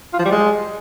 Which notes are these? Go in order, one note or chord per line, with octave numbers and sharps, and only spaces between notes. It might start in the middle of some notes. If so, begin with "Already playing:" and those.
F4
F3
G3
G#3